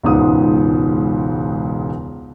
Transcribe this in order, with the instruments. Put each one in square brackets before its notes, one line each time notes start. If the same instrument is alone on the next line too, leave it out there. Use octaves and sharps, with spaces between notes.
[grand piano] E1 C#2 G#2 D#6